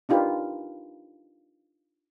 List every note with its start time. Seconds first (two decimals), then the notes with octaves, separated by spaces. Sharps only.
0.09 D4 D#4 F4 G4 A#4 B4